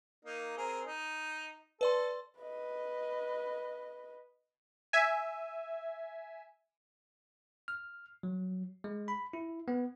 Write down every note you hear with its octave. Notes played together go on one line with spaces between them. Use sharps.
A#3 D#4
C4 G#4 A#4
D#4
A4 B4 D5 C6
B4 D#5
E5 G#5
F6
F#3
G#3
B5
E4
B3